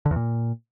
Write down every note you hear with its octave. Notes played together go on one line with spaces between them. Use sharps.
D3
E2
A#2